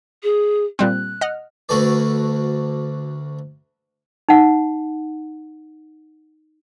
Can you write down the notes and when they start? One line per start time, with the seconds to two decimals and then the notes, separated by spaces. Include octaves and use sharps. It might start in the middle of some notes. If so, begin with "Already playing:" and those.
0.23 G#4
0.79 A#2 G3 C4 F#6
1.21 D#5 F#5 F6
1.69 D2 D3 F#4 A4 B4 D5
4.29 D#4 F#5